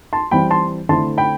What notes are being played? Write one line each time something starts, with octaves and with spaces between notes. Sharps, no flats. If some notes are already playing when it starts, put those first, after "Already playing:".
A5 C6
E3 G3 C4 E4 G5 B5
A5 C6
D3 A3 C4 E4 A5 C6
G5 B5